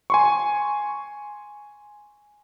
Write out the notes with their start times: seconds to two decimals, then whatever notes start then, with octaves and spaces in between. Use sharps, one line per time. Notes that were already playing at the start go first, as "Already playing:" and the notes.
0.10 G#5 C6 C#6